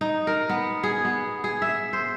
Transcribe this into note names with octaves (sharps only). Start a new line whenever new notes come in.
D#4
A#4
B3
G#4
B3
G#4
E5
C5